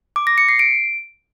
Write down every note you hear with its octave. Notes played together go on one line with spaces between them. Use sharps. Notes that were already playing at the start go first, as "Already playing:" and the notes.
D6
A#6
C#7
C7
D7